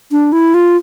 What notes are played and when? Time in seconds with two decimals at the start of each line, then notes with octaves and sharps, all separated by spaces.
0.12 D4
0.32 E4
0.54 F4